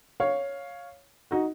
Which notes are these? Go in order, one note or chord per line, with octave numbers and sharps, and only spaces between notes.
C#5 F5
D#4 F#4